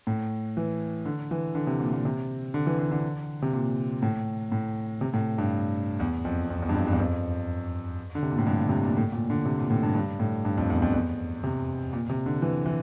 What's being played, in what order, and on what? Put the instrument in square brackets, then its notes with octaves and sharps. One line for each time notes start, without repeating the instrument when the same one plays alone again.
[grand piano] A2
E3
D3
E3
D3
C3
A#2
A#2
C3
D3
E3
D3
D3
C3
A#2
A2
A2
C3
A2
G2
E2
F2
F2
E2
G2
F2
G2
E2
F2
D3
C3
A#2
A2
G2
C3
A#2
A2
A#2
D3
C3
A#2
A2
G2
G2
A2
G2
F2
E2
F2
E2
C3
A#2
C3
D3
E3
E3